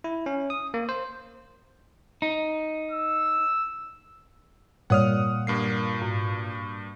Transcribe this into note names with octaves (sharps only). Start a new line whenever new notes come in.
E4
C#4
D#6
A#3
C5
D#4
E6
A#2 G3 C#5 D5 F#5 D#6 F6
G2 A#3 C7
G#2